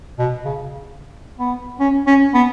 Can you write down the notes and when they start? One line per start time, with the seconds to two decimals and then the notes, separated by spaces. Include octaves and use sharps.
0.19 B2
0.45 C#3
1.39 B3
1.80 C#4
2.07 C#4
2.34 B3